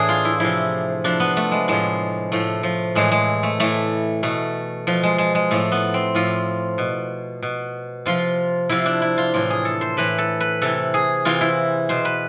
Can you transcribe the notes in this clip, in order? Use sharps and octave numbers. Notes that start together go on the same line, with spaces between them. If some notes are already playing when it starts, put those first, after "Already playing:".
Already playing: A2 E3 D4 G#4
F4
E4
C3 F3 E4
C3 F3 D4
B3
A3
G#3
A2 F3 G#3
A2 F3 A3
F3
A2 E3 G#3
G#3
A3
A2 E3 A3
B2 A3
B2 F3
G#3
G#3
G#3
A2 F3 A3
B3
C4
A2 F3 F4
B2
B2
C3 F3 F4
C3 F3 E4
D4
E4
F4
A2 E3 F4
G#4
A4
C5
A2 E3 B4
A4
B4
C3 E3 A4
G#4
C3 E3 F4
E4
B2 C5
B4